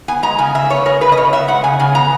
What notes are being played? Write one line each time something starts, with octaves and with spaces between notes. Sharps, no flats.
B3 G#5
G#3 A#5
C#3 G#5
C#3 E5
B3 C#5
G#3 A#4
C#3 B4
D#5
C#3 C#5
B3 E5
G#3 F#5
C#3 G#5
C#3 G#5
B3 A#5